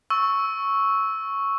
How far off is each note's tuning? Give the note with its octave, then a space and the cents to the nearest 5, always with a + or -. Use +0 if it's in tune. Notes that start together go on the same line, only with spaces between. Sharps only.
C#6 +0 E6 -10